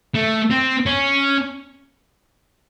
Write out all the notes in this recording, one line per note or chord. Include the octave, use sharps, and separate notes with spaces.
A3
C4
C#4